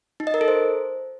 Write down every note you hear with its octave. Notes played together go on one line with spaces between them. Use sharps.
D#4
D#5
A#4
A4
C5